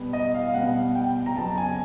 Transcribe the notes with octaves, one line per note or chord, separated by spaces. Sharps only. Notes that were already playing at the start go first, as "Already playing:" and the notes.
Already playing: B2 G3 B3
D#5
F5
F5
B2 G3 B3 F#5
G5
A#5
F2 C#3 F#3 B3 A5
G#5